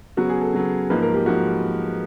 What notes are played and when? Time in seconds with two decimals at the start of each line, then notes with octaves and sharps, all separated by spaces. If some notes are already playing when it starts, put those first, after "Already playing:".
0.17 C#3 F#3 B3 F#4
0.29 G#4
0.41 A4
0.53 C#3 F#3 B3
0.90 G#2 F3 A#3 B4
1.02 A#4
1.14 G4
1.26 G#2 F3 A#3 F#4